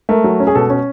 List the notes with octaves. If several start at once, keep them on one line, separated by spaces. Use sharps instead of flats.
A3 A#4
F#3
C#4
G#4
B2 A4
C#4